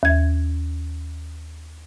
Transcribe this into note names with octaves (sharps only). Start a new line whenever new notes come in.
D#2 G#6